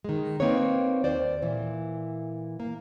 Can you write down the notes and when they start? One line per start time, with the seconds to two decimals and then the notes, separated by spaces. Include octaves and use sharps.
0.04 D#3 G#3
0.40 A#3 C4 D#4 B4 C#5
1.04 D#2 C5 D5
1.42 A#2 E3
2.60 A#3